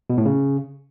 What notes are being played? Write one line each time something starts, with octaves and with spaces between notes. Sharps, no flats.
B2
A2
C#3